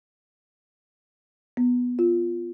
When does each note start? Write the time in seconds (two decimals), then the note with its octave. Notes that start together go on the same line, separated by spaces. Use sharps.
1.57 B3
1.99 F4